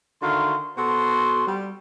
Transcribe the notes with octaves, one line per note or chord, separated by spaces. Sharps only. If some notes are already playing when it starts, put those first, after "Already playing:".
D3 D#3 F#4 E5 F5 C6
B2 F#4 A4 C5 C6
G3